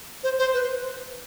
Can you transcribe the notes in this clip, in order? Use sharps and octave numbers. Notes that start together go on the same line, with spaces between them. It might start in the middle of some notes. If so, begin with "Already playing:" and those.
C5
C5
B4